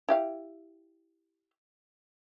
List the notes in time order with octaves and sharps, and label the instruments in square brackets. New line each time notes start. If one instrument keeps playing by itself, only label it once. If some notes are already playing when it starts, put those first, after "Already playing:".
[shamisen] E4 G4 F5